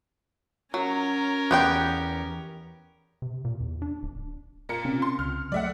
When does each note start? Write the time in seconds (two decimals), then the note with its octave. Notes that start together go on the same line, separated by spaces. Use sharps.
0.74 F#3 C#4 A#4
1.51 E2 B3 G4 B4 G5 C6
3.22 C3
3.45 A#2
3.61 E2
3.82 D4
4.03 D1
4.69 A#2 A#4 C#7
4.85 C3 C4 C#4
5.02 C6
5.19 C#2 F6
5.52 F#3 G3 A3 D5 E5 F#5